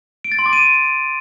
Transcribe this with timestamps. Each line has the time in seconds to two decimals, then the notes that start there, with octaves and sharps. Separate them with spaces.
0.24 D7
0.32 A6
0.39 C6
0.46 D6
0.53 D#7